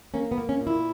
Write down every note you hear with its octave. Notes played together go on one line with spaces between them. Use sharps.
A#3 C#4
B3
A#3
C#4
A#2
E4